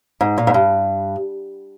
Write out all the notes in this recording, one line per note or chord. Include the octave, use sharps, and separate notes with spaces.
G#2
A#2
G#2
G2